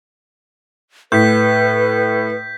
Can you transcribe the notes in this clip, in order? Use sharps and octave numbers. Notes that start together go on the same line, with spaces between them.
A2 B4 G6 B6